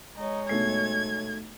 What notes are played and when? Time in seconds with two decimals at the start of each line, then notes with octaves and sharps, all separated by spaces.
0.16 G#3 D#4 C#5
0.49 B1 A3 G#6 C7